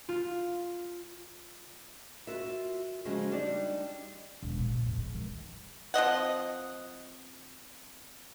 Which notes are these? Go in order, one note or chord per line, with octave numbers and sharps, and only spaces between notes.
F4
F4 F#4 A#4 E5
C#3 F3 F#3 G#3 C#4
G3 D4 D#4 G4 D5
E1
A#2
A2
E2
G#3
D#3
F3 C4 D#5 F#5